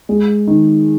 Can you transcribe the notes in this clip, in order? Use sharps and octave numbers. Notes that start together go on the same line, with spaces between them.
G#3
D#3